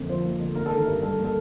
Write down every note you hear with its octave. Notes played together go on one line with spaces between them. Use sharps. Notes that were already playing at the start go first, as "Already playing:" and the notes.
Already playing: F2 D3 A#3
F3 C5
A#3
D3
A#3 A#4
A4
D#3
A#4
G2
G3 A4
A#3
A4